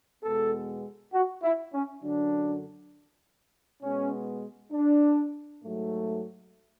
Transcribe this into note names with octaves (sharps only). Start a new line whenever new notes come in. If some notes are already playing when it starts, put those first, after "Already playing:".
E2 B2 G#3 B3 A4
F#4
E4
C#4
F#2 D3 F#3 D4
B2 G#3 B3 C#4
D4
G#2 F#3 A3